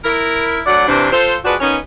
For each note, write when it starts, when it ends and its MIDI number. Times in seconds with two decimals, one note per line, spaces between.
0.04 0.59 64
0.04 0.59 70
0.65 0.85 38
0.65 0.85 54
0.65 0.85 74
0.65 0.85 78
0.87 1.10 43
0.87 1.10 48
0.87 1.10 52
0.87 1.10 62
0.87 1.10 72
1.11 1.34 65
1.11 1.34 69
1.11 1.34 72
1.45 1.55 53
1.45 1.55 56
1.45 1.55 62
1.45 1.55 66
1.45 1.55 71
1.60 1.76 51
1.60 1.76 59
1.60 1.76 61